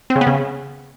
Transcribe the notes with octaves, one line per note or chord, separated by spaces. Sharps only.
C4
C#3
B3
C#3